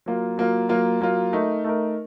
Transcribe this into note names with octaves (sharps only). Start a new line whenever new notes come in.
F#3 A#3 F4
F#3 A#3 F4
F#3 A#3 F4
F#3 A#3 F4
A3 D#4 A#4
A3 D#4 A#4